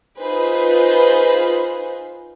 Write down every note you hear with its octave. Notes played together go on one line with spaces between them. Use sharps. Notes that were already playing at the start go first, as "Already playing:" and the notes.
D#4 F4 G#4 B4 C5